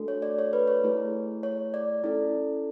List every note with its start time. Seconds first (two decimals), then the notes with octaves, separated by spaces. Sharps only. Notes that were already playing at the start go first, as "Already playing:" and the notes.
Already playing: A3 D4 F#4 A4
0.08 C#5
0.22 D5
0.39 C#5
0.53 B4
0.67 C#5
0.84 A3 E4 G#4
1.43 C#5
1.74 D5
2.04 C#4 E4 A4